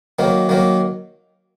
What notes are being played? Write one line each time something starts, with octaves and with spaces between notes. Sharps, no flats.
D#3 F#3 A#3
D#3 F#3 A#3